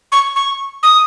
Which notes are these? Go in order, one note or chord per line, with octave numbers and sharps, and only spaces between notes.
C#6
C#6
D#6